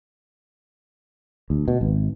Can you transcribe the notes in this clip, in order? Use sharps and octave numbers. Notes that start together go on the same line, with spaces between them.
D2
B2
G#1